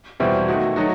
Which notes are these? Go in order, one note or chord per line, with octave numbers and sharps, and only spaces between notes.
E2 B2 G3 C4 E4
D#3 A3 D#4 F#4
F#3 A3 D#4 F#4